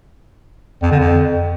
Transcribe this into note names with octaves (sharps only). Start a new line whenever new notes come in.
F2
D3
F2